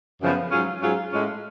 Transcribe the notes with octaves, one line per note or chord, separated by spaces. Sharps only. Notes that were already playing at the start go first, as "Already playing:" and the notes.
F#2 C#3 F3 B3
G#2 F#3 C#4 F4 G#4
G#2 F#3 C#4 F4 G#4
A2 G#3 C#4 F4 G#4